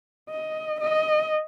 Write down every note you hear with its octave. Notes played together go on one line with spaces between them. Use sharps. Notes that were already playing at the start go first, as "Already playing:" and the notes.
D#5
D#5